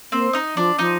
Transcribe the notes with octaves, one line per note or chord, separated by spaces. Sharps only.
A#3 C4 C5
D#4 D#5
F3 D4 D5
F3 D#4 D#5